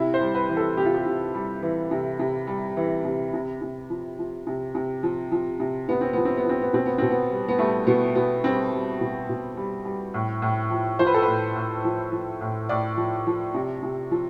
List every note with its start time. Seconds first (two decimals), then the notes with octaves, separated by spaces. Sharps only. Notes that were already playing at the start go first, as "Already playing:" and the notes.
Already playing: C3 E4
0.14 C5
0.21 G3
0.35 B4
0.49 E3
0.57 A4
0.77 C3 G4
0.86 F4
0.94 G4
1.06 C3
1.35 G3
1.62 E3
1.91 C3
2.19 C3
2.47 G3
2.77 E3
3.05 C3
3.34 C3
3.62 C3
3.90 F3
4.18 F3
4.47 C3
4.75 C3
5.03 F3
5.32 F3
5.60 C3
5.89 C3 B3
6.01 C4
6.13 F3 B3
6.25 C4
6.37 B3
6.45 F3 C4
6.62 B3
6.73 B2 C4
6.86 B3
6.98 B2 C4
7.11 B3
7.30 G3
7.48 B3
7.59 G3 A3
7.87 B2 B3
8.15 B2 B3
8.44 G3 C4
8.72 G3
9.01 B2
9.29 B2
9.57 G3
9.85 G3
10.14 A2
10.42 A2
10.71 F3
10.99 F3 C5
11.07 B4
11.14 A4
11.22 A2 B4
11.56 A2
11.84 F3
12.12 F3
12.41 A2
12.69 A2 D5
12.97 F3
13.27 F3
13.54 C3
13.83 C3
14.11 F3